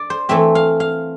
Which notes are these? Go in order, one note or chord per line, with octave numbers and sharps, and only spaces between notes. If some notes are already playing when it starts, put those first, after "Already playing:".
Already playing: D5
C5
E3 A3 C4 E5
F5
F5